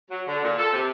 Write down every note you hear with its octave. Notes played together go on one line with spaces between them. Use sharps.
F#3
D3
A#2
A4
C3